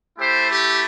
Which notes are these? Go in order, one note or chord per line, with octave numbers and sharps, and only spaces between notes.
A3 E4 G4 C5
G4